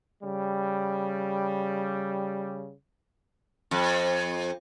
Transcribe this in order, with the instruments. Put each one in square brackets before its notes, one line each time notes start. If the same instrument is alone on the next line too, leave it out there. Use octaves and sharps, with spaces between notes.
[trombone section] C#3 G3
[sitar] F2